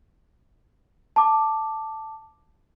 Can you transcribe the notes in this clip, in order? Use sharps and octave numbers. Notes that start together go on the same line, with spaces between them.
A5 D6